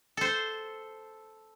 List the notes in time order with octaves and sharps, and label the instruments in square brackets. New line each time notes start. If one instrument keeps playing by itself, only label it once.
[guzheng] A4 C5